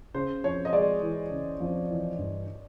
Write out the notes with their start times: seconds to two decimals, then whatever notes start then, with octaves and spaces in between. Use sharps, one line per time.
0.14 C#3 C5
0.44 F2 C#5
0.65 D#5
0.73 G#3 D5
1.02 E3
1.31 C#3
1.60 F2
1.89 E3
2.18 G2